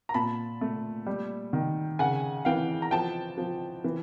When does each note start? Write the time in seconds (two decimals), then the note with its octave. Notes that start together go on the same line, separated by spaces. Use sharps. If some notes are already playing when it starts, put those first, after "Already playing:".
0.09 A#5
0.14 A#2 A5 B5
0.61 A3
1.06 G3
1.53 D#3
1.99 C#3 F#5 G#5
2.45 E3 F5 G5
2.82 A#5
2.91 F3 G5 A5
3.38 F3
3.84 E3